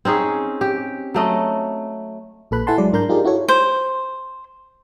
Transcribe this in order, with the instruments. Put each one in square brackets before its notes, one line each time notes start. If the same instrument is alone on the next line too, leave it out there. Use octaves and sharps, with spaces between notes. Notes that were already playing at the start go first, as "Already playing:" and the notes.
[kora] C4 C#4 D#4 G#4
G4
F#3 A3 D#5
[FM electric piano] A#1 A#2 A4 B4 B5 F#6
E4 A4 F#5 G#5 A5 C6
F#3 G#3 D5
G#2 D4 A#4 A#5 C6 G6
D#4 F4 G4 G#4 A#4 D5
E4 F#4 A4 C#5
[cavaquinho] C5